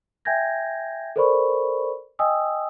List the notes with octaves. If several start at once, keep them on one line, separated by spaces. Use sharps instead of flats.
E5 G5 G#5 G6 G#6 A#6
A4 A#4 C5 D5 B5 C#6
D#5 G5 G#5 D#6 E6